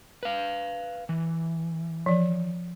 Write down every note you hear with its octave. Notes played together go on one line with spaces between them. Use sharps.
B4 F5
E3
F3 D5